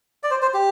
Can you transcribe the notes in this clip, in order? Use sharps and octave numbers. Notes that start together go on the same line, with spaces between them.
D5
C5
C5
G4